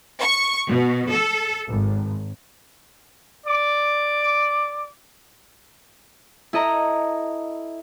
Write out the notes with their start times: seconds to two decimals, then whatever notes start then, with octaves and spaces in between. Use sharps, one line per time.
0.22 C#6
0.69 B2
1.11 A4
1.68 G#1
3.46 D5 D6
6.53 E4 A4 D#5 A#5